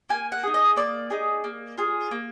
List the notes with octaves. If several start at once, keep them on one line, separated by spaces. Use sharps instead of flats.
A#3 G#5
F#5
D#4 G#4
D#5
A#3 D5
D#4 G#4
A#3
F4 G#4
A#3